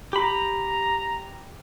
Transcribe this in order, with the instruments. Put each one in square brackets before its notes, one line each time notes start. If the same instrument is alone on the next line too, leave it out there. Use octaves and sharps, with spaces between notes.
[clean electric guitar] G4 B5 [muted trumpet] A#5